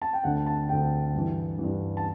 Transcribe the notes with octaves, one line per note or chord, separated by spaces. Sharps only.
A5
G5
D2 D3 F#5
A5
D2 D3 G5
G2 E3
G2 E3
A5